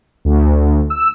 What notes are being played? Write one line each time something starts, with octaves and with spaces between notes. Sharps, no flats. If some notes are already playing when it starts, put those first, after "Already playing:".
D2
E6